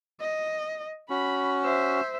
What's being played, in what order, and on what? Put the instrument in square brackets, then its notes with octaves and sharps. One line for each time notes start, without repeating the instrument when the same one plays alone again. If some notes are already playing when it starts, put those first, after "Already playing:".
[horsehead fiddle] D#5
[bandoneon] C#4 F#4 [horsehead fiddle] B5
[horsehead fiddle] C5 E5